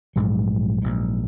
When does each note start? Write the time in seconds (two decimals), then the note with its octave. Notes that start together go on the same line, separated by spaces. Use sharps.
0.16 A#1 G#2 F#3
0.82 A#1 G#2